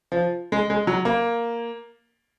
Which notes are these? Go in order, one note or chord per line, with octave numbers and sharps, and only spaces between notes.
F3
G#3
G#3
F#3
A#3